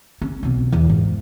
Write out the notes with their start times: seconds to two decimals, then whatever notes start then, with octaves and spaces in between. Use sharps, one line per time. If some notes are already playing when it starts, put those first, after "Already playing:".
0.22 C#4
0.43 B1 C#4
0.72 E2
0.90 G#2